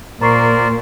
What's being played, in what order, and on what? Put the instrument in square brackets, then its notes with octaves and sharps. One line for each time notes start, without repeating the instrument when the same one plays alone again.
[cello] A#2 [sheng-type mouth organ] A#4 C5 D5 [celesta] A#5 C#6 C7